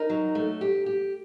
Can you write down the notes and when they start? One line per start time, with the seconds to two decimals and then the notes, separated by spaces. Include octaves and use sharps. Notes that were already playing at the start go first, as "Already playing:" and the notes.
Already playing: D#4 A#4
0.10 F#3
0.35 A3
0.61 G4
0.86 G4